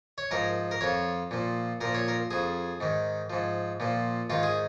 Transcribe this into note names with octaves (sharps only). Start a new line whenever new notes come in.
C#5
G#2 F3 A#4
A#4
F2 F3 C#5
A#2 F3
A#2 F3 A#4
C#5
A#4
F2 F3 G#4
G#2 D#3
G#2 F3
A#2 F3
G#2 D#3 F4
G#4